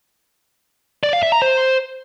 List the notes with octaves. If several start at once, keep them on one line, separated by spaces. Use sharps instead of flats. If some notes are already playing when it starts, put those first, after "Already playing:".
D5
F5
E5
A#5
C5